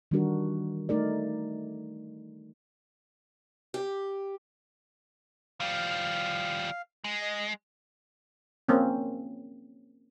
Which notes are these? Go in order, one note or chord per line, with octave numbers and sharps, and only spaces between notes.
D#3 E3 G3 D4 F#4 A#4
A3 D#4 A#4 D5
G4
F3 G3 F5
G#3
D#5
A#3 C4 C#4